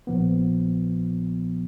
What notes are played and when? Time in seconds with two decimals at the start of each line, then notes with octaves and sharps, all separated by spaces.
0.07 A#1 A#2 F3 B3